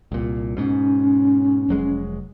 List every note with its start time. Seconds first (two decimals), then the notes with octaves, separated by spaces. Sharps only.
0.12 C2 A#2
0.57 G#2 B2 C#4
1.69 F1 F#3 G#3